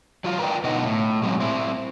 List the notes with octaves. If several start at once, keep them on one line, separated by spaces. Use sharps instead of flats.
F#3 F4 F5
A#4 B4 D5 G5
B2 D3 B3 D#4 D#5 F#5
A2
A#2 F#3 G#3 C4 C#4
C4 E4